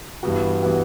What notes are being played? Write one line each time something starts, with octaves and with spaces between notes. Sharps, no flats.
G2 E3 G3 B3 F#4
E3 G3 B3 F#4